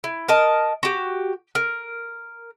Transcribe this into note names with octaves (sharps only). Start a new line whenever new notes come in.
E4
A#4 D#5 A5
F#4 G4
A#4